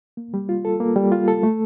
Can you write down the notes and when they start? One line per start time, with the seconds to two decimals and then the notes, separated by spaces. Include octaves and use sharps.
0.17 A#3
0.34 G3
0.49 F4
0.65 A4
0.80 A#3
0.96 G3
1.12 F4
1.28 A4
1.43 A3